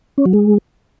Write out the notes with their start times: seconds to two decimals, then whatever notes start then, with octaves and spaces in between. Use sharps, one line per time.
0.18 C#4
0.26 F#3
0.33 G#3